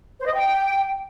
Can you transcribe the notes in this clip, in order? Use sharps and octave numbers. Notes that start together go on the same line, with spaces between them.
C5
D#5
G5